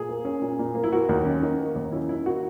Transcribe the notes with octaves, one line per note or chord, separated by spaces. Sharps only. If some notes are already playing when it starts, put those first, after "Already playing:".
Already playing: A#2 G#4
A#3
C#4
A#2
A#2
A#3
E4
A#3 F#4
D#2
C#4
D#3
A#3
D#2
C#4 E4
D#3 E4
A#3 F#4